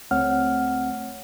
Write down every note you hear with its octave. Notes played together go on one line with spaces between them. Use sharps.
C#2 A3 C4 C#5 F#5 F6